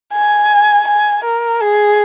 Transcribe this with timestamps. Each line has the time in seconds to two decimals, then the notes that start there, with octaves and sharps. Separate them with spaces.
0.13 G#5
0.87 G#5
1.24 A#4
1.61 G#4